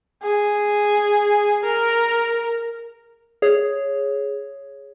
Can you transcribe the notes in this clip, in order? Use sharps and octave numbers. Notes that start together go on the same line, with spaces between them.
G#4
A#4
G#4 C#5